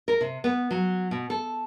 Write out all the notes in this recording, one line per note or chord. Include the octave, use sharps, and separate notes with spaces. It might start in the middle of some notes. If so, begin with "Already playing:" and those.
A#4
C3
B3
F#3
B2
A4